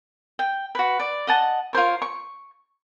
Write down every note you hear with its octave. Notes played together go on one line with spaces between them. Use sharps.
G5
F#4 B4
D5
D#5 F#5 A5
F4 A#4 C5 C#5
C#6